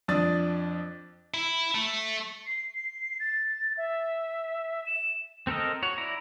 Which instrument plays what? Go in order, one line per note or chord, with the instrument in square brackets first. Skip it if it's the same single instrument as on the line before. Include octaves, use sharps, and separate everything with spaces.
[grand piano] F2 D4 D5 D#6 A6
[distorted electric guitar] E4
A3
[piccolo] C7
C7
A6
E5
E7
[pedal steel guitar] C4 A4 A#4 D#5
F#4 C#5
E4 D5 A#5